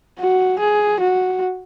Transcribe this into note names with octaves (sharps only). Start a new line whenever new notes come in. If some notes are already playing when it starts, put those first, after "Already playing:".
F#4
G#4
F#4